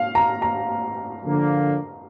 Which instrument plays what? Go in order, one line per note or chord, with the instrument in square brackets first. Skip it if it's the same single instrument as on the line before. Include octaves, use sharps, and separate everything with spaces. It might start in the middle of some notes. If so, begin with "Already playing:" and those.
Already playing: [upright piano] F5
A#5
A#5
[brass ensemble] D3 F3 A#3